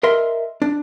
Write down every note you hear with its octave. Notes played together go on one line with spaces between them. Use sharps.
A#4 D#5 E5 C6
D4